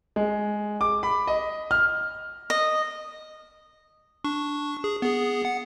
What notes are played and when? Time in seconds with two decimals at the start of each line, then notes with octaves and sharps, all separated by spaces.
0.16 G#3
0.81 D6
1.03 B5
1.27 D#5
1.71 F6
2.50 D#5
4.24 D4 C#6
4.84 G#4
5.02 B3 G#4
5.45 F#5